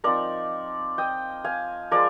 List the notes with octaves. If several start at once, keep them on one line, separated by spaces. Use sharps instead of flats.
F3 C4 D#4 A#4 D5
D#5 G5
F5 G#5
F3 G#3 A#4 D5